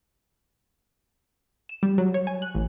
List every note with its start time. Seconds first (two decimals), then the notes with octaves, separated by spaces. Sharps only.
1.69 E7
1.83 G3
1.98 F#3
2.14 C#5
2.27 G#5
2.42 F#6
2.55 A1